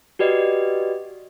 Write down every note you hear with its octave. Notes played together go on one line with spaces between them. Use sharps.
F#4 G4 B4 D5 D#5